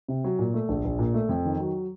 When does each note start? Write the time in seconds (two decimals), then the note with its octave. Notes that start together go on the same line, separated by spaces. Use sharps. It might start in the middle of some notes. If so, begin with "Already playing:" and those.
0.08 C3
0.24 F#3
0.39 A#2
0.54 A3
0.69 A#1
0.85 A#1
0.99 A#2
1.14 A3
1.29 F2
1.45 D#3
1.60 F#3